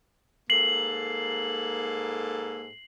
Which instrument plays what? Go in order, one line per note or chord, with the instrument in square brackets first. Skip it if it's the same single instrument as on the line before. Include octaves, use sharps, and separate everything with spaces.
[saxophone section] G#2 A#3 A4 [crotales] C7 F#7